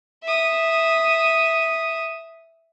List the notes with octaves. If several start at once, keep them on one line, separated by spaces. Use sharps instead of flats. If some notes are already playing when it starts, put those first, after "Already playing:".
E5 D#6